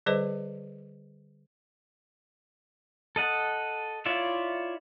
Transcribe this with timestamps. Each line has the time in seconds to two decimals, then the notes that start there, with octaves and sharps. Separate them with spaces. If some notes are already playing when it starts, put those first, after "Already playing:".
0.06 D3 G3 G#4 B4 C5 D#5
3.16 A4 D#5 F#5
4.06 E4 F4 C#5 D5 E5